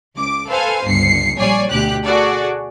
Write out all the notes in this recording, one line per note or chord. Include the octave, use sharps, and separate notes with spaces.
C#2 D6
A4 B4 C5 F5 G#5
G1 C#2 C7 C#7
A#1 G3 C#5 D5 G#5 C7
D2 B2 G4 F#6
F#4 G#4 A4 D5